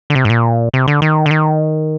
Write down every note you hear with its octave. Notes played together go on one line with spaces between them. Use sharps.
D3
C3
G#2
A#2
C3
D3
D#3
D3
D#3